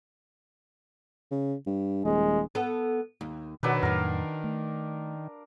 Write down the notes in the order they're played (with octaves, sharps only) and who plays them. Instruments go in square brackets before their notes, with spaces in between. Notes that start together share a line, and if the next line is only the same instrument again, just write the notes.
[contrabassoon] C#3
G2
[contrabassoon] D#1 [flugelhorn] G#3
[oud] B3 A4
D#2
[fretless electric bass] B2 [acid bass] D#3 [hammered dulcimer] F#3 D4 B4
[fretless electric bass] F2 A2 F#3 [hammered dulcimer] A#4 F5
[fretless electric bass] A3